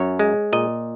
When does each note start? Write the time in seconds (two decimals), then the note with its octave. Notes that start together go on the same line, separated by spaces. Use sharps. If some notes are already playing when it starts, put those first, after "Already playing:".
Already playing: F#2 C#5
0.19 G#3
0.53 A#2 D#5